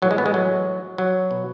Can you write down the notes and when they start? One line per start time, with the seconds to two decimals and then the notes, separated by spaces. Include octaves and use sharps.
0.02 A2 E3 F#3
0.11 G#3
0.18 B3
0.26 G#3
0.34 F#3
0.98 F#3
1.31 B2